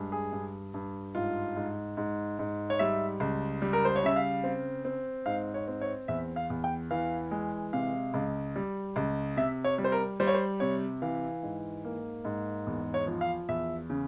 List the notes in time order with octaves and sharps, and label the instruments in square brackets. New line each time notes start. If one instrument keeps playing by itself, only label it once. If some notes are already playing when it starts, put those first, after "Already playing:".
Already playing: [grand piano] G2 G#3
G#4
G2
G2
G#2 F4
G#2
G#2
G#2
C#5
G3 E5
C#2
G3
A#4
C5
C#5
C#3 E5
F5
C4
C4
G#2 F5
C#5
C4
C#5
E2 E5
F5
E2
G5
E3 F5
G#3
C3 F5
C#2
G3
C#2
C3 E5
C#5
G3
C5
A#4
G3 C5
C#5
C5
C3 C#5
E3 F5
G#2
A#3
G#2
E2
C#5
F3
F5
E2 E5
C#3